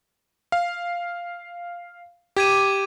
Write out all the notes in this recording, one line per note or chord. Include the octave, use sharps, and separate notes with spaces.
F5
G4 D6 G#6 D#7